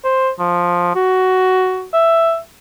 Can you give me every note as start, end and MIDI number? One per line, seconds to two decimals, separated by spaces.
0.04 0.30 72
0.39 0.92 53
0.95 1.87 66
1.93 2.38 76